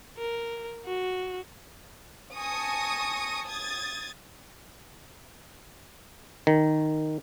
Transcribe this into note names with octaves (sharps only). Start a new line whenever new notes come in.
A#4
F#4
G#5 A5 C#6 D#6 A#6
D#6 G#6 A6
D#3